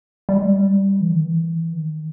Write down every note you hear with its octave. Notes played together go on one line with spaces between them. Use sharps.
G3
G#3
G3
E3
D#3
E3
D#3